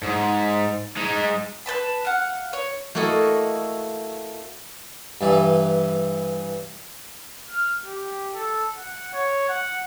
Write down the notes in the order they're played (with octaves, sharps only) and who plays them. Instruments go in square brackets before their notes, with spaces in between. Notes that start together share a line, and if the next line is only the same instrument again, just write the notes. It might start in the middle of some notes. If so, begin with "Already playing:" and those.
[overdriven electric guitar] G#2
G#3 D#4
[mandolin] B4 C5 A5 B5
F5 F#5
C#5
[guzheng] A3 A#3 E4 F#4 A4 D#5
[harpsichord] G2 E3
[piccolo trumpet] F6
G4
A4
F#5
C#5
F#5